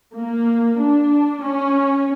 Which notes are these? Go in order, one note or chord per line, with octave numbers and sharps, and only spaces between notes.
A#3
D4
C#4